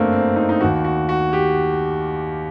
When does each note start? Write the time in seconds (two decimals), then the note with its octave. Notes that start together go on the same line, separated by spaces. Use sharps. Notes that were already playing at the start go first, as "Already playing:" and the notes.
Already playing: G1 F#2 D3 A3 A#3 C4 D4
0.13 C4
0.36 D#4
0.49 D#4
0.61 D#2 D#3 F#4
0.84 F#4
1.09 F#4
1.33 G4